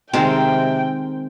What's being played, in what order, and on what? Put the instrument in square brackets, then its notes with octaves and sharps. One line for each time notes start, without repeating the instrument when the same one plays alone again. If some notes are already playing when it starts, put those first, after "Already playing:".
[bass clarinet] C3 [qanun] D#3 G#3 A#4 [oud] C4 [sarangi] G5